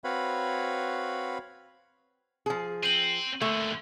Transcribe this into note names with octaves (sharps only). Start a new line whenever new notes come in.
C4 F#4 B4 C#5 F5 B5
F3 G#4
C4 D#7 F#7
A#2 D3 A3